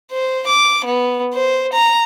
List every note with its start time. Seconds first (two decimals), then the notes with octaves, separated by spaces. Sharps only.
0.11 C5
0.47 D6
0.85 B3
1.34 C5
1.73 A#5